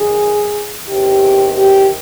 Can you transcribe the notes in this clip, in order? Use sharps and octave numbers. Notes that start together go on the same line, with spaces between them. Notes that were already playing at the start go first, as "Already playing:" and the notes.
Already playing: F#2 D#3 G#4
E2 C3 D#3 G4
G4